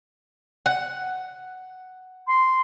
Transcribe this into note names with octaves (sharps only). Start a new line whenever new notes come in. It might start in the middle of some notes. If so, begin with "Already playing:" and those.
F#5
C6